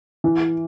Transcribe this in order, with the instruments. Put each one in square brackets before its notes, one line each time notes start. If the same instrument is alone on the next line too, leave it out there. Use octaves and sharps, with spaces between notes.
[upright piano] E3